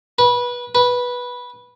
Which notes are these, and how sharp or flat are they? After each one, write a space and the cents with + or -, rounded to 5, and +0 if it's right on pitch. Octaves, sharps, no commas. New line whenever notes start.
B4 -20
B4 -10